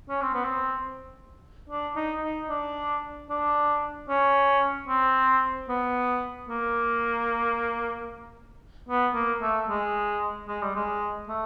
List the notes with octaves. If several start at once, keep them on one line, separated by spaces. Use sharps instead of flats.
C#4
C4
B3
C4
D4
D#4
D#4
D4
D4
C#4
C4
B3
A#3
B3
A#3
A3
G#3
G#3
G3
G#3
A3